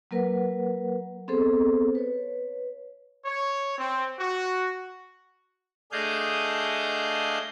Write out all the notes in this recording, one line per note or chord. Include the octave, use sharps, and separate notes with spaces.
F#3 A#3 A#4 B4 F#5
B3 C4 G#4 A4 C5
B4 C#5
C#5
C4
F#4
A3 D4 G#4 D#5 F5 G6